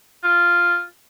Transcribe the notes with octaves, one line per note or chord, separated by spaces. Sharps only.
F4